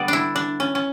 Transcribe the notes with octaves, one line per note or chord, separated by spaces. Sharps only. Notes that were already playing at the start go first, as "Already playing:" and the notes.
Already playing: D3 G3 B3 D5
D4 E4
D4
C#4
C#4